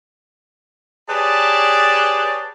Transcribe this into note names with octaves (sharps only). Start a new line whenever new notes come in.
G4 G#4 B4 C#5 D5 A5